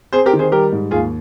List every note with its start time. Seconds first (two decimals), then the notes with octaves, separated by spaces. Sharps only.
0.13 C4 G#4 C5
0.26 G4 A#4
0.33 D#3
0.39 G#4 C5
0.52 G3 G4 A#4
0.72 G#2
0.91 D#2 F4 G#4